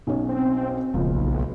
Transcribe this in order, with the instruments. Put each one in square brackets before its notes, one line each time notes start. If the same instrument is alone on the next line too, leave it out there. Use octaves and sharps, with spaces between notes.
[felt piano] B1 C#4
[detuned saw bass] C4
[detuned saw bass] E1 [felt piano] C#2 A#2 F3
[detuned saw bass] B1